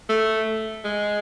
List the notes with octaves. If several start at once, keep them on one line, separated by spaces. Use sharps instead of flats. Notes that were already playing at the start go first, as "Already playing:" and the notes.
A3
G#3